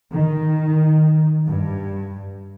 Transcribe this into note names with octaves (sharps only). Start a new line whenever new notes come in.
D#3
G2